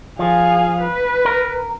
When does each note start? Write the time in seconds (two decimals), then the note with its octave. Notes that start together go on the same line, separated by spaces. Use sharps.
0.19 F3 G#4 F5
0.81 B4
1.25 A#4